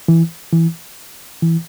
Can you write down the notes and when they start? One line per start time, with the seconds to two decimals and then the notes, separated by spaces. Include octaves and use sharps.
0.08 E3
0.53 E3
1.43 E3